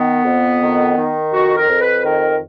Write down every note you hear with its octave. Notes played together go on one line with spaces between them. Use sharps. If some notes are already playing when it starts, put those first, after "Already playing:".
Already playing: D#3 B3
F2
D#3
D#3
F2 F#4
A#4
F2
B4
D#3 A#4